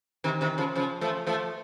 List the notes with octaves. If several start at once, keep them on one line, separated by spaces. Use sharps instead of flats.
C3 D#3
C3 D#3
C#3 F3
C#3 F3
F3 A3
F3 A3